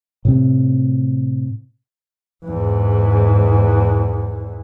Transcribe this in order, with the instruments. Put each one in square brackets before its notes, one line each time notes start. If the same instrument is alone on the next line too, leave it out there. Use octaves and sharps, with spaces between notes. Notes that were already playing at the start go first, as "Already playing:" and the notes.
[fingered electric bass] A2 C3 C4
[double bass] E2 G#2